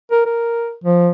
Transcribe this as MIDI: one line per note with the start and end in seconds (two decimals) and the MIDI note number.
0.11 0.21 70
0.26 0.74 70
0.84 1.11 53